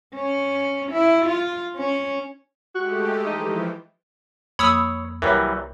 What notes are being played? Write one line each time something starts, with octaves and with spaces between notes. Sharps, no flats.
C#4
E4
F4
C#4
G#3 A3 F#4 G4
E3 F3 D#4
F2 A#3 C#5 B5 D#6 E6
C2 E3 F#3 G3 A#4 C#5 E5